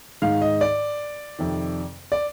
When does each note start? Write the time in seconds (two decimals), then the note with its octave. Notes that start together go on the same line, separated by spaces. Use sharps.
0.22 G#2 D#3 F5
0.42 D#5
0.61 D5
1.39 F2 C3 D#3
2.12 D5